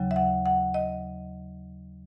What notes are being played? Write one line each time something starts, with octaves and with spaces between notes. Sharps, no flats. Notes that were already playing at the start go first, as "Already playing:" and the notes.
Already playing: D#2 C#3 F#3
E5
F#5
F#5
D#5